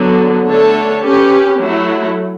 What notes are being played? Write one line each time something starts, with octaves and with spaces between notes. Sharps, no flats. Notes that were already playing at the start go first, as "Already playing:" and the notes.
Already playing: D3 F#3 B3
D3 A3 D4 A4 C#5
C#4 G4 B4
F#3 A3 E4